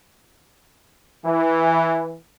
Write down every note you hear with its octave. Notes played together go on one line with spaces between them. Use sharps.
E3